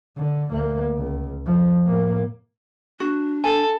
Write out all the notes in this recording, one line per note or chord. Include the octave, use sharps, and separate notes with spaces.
D3
D2 A#3
C#2
F2 F3
A2 A#3
D4 F#4
A4 G#5